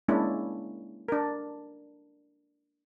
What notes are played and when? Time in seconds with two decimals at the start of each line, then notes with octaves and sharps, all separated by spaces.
0.08 G#3 A#3 C#4 D4 E4
1.08 D4 A#4